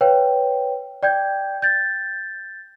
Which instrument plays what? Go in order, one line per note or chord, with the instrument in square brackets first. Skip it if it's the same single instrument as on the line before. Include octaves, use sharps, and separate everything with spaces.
[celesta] B4 C#5 F5 G5
D5 G5 G6 G#6
G6 A6